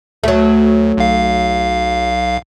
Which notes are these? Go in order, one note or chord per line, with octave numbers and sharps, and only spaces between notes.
D2 F#3 A3
B1 F5